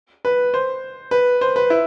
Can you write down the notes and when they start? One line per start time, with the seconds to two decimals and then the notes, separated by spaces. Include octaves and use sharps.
0.25 B4
0.54 C5
1.11 B4
1.41 C5
1.56 B4
1.70 E4